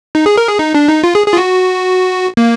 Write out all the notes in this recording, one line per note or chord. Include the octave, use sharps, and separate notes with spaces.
D#4
G#4
A#4
G#4
D#4
D4
D#4
F4
G#4
G#4
F4
F#4
A#3